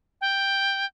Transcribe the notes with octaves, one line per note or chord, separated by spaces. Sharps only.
G5